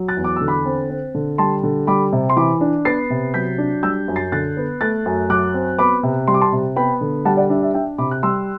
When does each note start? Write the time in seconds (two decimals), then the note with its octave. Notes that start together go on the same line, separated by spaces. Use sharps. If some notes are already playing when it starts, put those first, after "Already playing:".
Already playing: F#3
0.08 F#6 A6
0.17 E2
0.24 D6
0.36 D3 E6
0.48 B5 D6
0.65 C4
0.90 C4
1.15 D3
1.38 G3 A5 C6
1.63 D3
1.87 G3 B5 D6
2.12 C3
2.30 C6
2.37 E3 B5 D6
2.61 D4
2.85 B3 A6 C7
3.10 C3
3.34 F#3 G6 B6
3.58 D4
3.83 G3 E6 G6
4.08 F#2
4.16 A6 C7
4.32 D3 F#6 A6
4.57 B3
4.81 A3 F#6 A6
5.06 F#2
5.30 F#3 D6 F#6
5.54 C4
5.79 B3 B5 D6
6.03 C3
6.28 G3 C6
6.34 D6
6.41 A5 C6
6.52 C3
6.76 B3 G5 B5
7.01 D3
7.25 G3 F#5 A5
7.37 D5 F#5
7.50 D4 E5
7.62 E5
7.74 D4 E5 G5
7.98 C3 B5 D6
8.11 F#6
8.23 G3 C6 E6